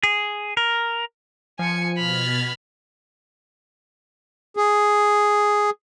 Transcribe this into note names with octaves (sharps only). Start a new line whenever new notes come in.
G#4
A#4
F3 G#5 C#7
B2 B5 F6 G#6 A6
G#4